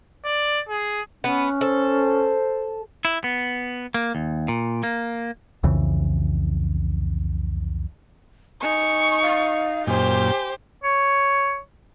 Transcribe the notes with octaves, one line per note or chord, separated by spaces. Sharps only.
D5
G#4
B3 C#4
A4 C5
E4
B3
A#3
D#2
A#2
A#3
C2 F2 C#3 E3
D#4 G#5 C#6
F5
F#2 A#2 G4 C5 G#5
C#5